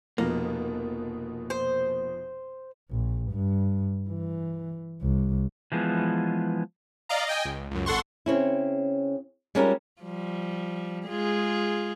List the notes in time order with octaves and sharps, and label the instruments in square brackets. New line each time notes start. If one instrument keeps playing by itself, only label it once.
[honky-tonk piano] F1 B2 F3 [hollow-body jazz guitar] A#3
[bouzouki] C5
[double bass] A#1
G2
E3
C2
[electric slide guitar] E3 F3 G#3 B3
[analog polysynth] D5 D#5 F5 A#5
D#5 G5 G#5
C#2
C#2 F#2
G#1 A4 F#5 C6 C#6
[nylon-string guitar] C#3 C4 C#4 E4
G3 G#3 C#4 D#4 F4 A#4
[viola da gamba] F3 G3
G#3 F4 G#4